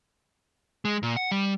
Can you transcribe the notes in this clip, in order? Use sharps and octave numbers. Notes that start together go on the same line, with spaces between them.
G#3
A#2
F#5
G3